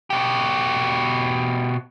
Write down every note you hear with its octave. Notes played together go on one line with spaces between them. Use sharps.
B2 G4